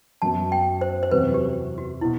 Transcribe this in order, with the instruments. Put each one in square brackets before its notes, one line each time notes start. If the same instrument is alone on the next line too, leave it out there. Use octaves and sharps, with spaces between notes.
[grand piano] F#2 F#3 B3 F#4 [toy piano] A5
[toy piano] G5
C5
C5
[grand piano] E2 C3 F#3 [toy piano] B4
[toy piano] G4
F#4
[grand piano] B2 [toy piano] E4